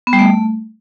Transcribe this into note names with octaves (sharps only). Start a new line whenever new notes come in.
B3
G3
A3